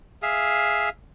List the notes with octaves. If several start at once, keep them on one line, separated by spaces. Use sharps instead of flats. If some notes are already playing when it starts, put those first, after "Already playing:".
G#4 E5 F5